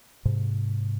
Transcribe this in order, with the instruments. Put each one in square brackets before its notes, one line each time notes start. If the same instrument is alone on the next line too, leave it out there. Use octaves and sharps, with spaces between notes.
[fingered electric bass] G#2 C3